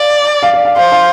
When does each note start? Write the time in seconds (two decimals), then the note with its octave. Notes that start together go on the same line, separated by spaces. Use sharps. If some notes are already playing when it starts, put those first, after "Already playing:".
Already playing: D5 F5
0.43 F5
0.54 D5
0.65 F5
0.76 C5 F5
0.92 F5